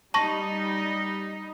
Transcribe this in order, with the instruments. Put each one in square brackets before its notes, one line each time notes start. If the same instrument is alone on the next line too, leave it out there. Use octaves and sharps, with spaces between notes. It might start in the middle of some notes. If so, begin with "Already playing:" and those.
[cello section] G3 D#4 [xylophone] A5 C#6 A#6